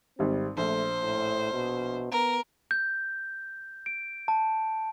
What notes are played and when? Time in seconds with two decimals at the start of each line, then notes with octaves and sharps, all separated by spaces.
0.19 G#1 G3 C4
0.57 A#1 A3 C5
1.02 A2
1.53 B2
2.12 B3 A#4
2.71 G6
3.86 D7
4.28 A5